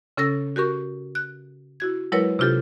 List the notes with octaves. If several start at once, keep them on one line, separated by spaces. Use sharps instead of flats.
C#3 C#4 A4 E6 A#6
F#4 G4 A#4 C#6
F#6
E4 F#4 G#6
F#3 G#3 E4 A#4 B4 C#5
C3 D4 F4 G4 A4